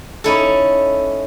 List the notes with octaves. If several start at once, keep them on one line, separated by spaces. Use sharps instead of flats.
C#4 D#4 E4 A4